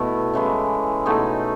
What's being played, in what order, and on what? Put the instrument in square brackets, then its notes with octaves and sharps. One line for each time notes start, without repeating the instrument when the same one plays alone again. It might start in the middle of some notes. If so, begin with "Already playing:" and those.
Already playing: [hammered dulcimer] B2 A3 E4
C#3 E3 G#3
B2 A3 D#4 G#4